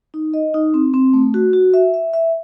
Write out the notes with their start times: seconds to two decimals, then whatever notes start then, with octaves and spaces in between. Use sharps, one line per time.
0.14 D#4
0.34 D#5
0.54 D#4
0.74 C4
0.94 C4
1.13 A3
1.34 F#4
1.53 F#4
1.74 E5
1.94 E5
2.14 E5